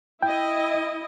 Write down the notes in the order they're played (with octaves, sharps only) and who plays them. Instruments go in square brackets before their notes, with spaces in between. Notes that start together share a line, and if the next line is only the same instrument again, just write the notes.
[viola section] E4 D#5 [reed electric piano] G5